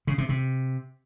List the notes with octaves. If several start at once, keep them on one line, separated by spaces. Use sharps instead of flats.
C#3
C3
C3